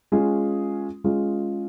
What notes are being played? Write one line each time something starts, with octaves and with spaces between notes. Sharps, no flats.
G#3 C#4 F4 G#4
G#3 C#4 F4 G#4